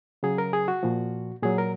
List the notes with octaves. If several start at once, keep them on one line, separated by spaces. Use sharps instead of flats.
C#3 F#3 G#4
A#4
G#4
F#4
A#2 F3
A#2 F#3 G#4
A#4